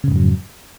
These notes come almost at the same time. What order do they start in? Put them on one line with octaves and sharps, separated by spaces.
C#3 G#2 F2 F#3